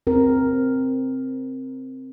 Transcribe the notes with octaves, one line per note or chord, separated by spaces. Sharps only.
C4 A#4